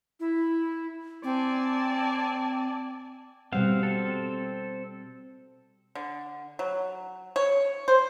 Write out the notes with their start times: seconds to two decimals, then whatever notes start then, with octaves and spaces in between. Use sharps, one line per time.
0.20 E4
1.24 C4 D5 G#5 A5
3.52 B2 G3 C4 F5 F#5
3.83 C4 A4
5.95 D3
6.59 F#3
7.36 C#5
7.88 C5